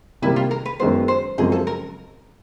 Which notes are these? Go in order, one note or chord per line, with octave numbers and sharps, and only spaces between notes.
C3 D#3 G3 A#3 E4
F4
A#4
B4
F#2 D#3 G#3 B3 C5
C5
F#2 C#3 F3 G#3 C4 G#4
A4
A#4